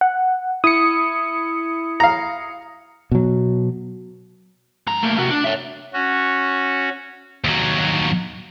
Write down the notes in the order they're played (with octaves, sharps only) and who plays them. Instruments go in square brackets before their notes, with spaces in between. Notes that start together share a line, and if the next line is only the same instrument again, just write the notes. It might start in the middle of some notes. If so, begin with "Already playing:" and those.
[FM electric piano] F#5
[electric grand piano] E4 [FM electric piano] D#6 C#7
[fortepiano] F5 A#5
[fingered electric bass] B2 F#3
[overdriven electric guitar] G#2 A#5
A3 A#3
C3 F#4
D4
C#5 E5
[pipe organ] C#4 F#4
[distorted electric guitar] D#2 F#3